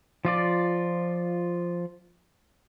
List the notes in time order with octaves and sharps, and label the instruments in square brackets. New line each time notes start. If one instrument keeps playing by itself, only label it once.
[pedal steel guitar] F3 F4 D5